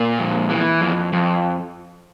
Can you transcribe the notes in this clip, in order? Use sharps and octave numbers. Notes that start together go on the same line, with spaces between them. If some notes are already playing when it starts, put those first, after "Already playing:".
Already playing: A#2 A#4
F2
E3
F2
F2